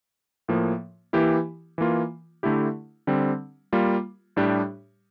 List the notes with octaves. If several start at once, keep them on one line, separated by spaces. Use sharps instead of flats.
A2 F3 A#3
E3 A#3 E4 G4
E3 A#3 F4
D3 A3 E4 G4
D3 G3 C4
G3 A#3 F4
A2 G3 D4 G4